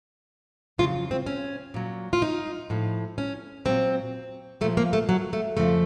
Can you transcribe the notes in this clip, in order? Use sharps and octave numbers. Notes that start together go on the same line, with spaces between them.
F2 C#3 F#3 F4
C4
C#4
A#2 F#3
F4
D#4
A2 F3
C#4
A#2 F#3 C4
A#2 F3 A3
A#3
A3
F#3
A3
F2 C#3 F3 A3